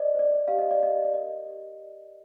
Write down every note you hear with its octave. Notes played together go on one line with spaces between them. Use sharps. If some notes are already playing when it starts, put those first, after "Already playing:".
Already playing: C5 D5 D#5
C5 D5
G4 F5
D#5
D5
G4 D#5
D5
A#4 D#5
G4
D5